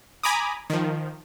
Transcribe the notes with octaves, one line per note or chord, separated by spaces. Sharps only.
G#5 A#5 B5 D6 D#6
D#3 F3